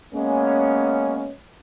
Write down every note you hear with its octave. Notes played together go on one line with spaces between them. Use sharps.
G#3 A#3 B3 C#4